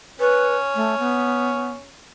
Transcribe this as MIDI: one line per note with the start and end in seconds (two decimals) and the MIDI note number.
0.20 1.92 61
0.20 0.55 71
0.75 0.95 57
0.99 1.73 59